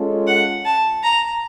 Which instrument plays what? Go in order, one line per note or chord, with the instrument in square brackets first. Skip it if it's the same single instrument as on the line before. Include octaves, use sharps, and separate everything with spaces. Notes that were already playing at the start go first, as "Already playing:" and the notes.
Already playing: [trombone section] G#3 C#4 F4 A4
[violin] F#5
A5
A#5